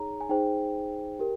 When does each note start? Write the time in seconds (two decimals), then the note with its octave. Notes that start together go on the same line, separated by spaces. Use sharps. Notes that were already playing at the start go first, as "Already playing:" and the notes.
Already playing: D#4 G#4 C#5 A#5
0.21 G#5
0.29 D#4 G#4 C5 G5
1.19 G4 A#4